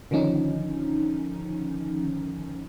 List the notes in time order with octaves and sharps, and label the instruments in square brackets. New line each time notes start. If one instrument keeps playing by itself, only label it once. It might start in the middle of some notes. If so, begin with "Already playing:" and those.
[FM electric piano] D3 D#3 F3 C#4 D#4